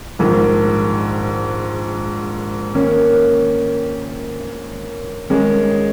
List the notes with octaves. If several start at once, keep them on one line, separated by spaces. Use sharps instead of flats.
A#1 G#2 D#3
D#3 A#3 C#4
D#3 G#3 C#4